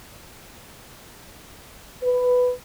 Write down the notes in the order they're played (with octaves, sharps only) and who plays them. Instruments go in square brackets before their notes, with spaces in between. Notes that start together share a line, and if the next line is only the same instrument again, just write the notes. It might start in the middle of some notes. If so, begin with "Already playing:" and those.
[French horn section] B4